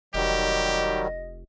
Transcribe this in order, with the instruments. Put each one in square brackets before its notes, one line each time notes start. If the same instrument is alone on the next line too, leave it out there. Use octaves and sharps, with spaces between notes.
[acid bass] F1 [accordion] D#3 F#3 G3 [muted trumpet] G4 [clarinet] D#5